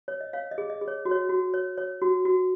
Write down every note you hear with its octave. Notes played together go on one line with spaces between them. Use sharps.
C#5
D#5
C#5 F5
D#5
G#4
D#5
G#4
C#5
F#4
C#5
F#4
C#5
C#5
F#4
F#4